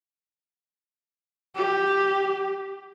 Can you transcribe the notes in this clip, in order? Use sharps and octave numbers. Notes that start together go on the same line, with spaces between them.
G4